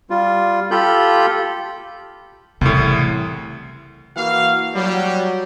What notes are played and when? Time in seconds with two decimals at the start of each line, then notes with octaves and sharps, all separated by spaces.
0.10 G3 F4
0.71 F4 G4 A4 B5 G6
2.61 C2 A2 C#3 E3
4.16 E3 A#3 F#4 F5
4.74 F#3 G3